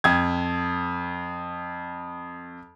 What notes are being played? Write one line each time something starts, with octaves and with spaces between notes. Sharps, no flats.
F2 G#6